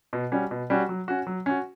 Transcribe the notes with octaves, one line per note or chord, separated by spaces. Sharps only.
B2
G3 C#4 F#4
B2
G3 C#4 F#4
F#3
C#4 F#4
F#3
C#4 F#4